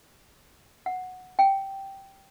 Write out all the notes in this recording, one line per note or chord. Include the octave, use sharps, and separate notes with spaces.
F#5
G5